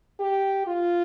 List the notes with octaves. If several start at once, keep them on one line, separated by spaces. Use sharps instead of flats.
G4
F4